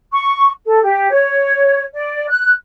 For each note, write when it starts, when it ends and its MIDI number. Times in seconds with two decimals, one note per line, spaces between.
0.12 0.48 85
0.66 0.80 69
0.83 1.09 67
1.10 1.82 73
1.94 2.26 74
2.29 2.51 90